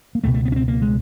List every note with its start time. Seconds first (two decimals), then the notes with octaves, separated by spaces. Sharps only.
0.15 A#3
0.24 C#2 B2 A3
0.34 A3
0.45 B3
0.52 C#4
0.56 C4
0.68 A#3
0.82 G#3